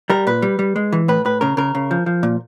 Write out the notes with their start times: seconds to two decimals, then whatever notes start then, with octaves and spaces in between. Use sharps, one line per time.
0.10 G3 A#4
0.27 A#2 B4
0.42 G3
0.59 G3
0.76 G#3
0.93 E3
1.08 A2 B4
1.25 A2 B4
1.41 C#3 A#4
1.57 C#3 A#4
1.75 C#3
1.91 F3
2.06 F3
2.23 A#2